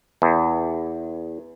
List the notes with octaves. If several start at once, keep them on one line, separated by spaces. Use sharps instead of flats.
E2